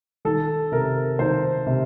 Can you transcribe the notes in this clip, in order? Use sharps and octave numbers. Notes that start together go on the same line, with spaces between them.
D#3 A4
C3 A#4
D#3 C5
C3